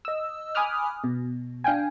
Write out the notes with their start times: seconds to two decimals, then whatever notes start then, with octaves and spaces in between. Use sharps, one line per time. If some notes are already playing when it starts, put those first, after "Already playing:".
0.05 D#5 E6
0.55 G#5 B5 D6 D#6 F6 F#6
1.04 B2
1.64 D4 F5 G5 G#5